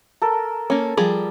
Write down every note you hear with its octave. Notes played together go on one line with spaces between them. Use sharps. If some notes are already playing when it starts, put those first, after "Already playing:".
A4 A#4
A#3 C#4
F3 G3 G#4